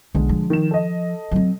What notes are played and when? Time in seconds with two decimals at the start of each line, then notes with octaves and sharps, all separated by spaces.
0.15 B1 D3 G#3
0.29 F3
0.50 D#3 E7
0.71 A4 D#5
1.31 F#3 C4